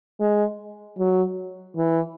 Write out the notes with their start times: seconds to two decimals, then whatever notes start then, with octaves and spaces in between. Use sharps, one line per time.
0.20 G#3
0.99 F#3
1.77 E3